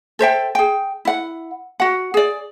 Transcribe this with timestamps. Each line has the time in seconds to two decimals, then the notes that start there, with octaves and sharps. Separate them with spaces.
0.19 A4 C5 E5 G5
0.55 G#4 G5
1.05 E4 F#5
1.80 F#4 F#5
2.14 G#4 D5